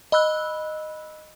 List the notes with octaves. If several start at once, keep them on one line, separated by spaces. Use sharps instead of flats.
D#5 B5 E6 F#6